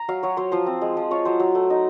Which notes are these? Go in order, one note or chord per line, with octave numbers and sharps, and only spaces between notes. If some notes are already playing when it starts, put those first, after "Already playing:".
Already playing: A#5
F#3 F5
F#3 C#5
F#3 C5
F3 C5
C4
G#3
F3
F4 C#5
F#3 C5
F#3
A3
D#4